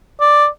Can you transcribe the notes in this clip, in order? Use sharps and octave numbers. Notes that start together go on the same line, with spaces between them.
D5